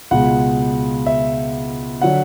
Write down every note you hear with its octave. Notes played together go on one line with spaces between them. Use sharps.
C#2 B2 G#3 F#5
E5
D3 F#3 F#5